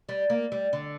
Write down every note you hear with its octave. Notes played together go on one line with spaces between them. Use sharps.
G3
A#3
G3
D3